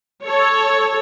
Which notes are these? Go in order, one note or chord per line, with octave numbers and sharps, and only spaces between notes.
A4 C#5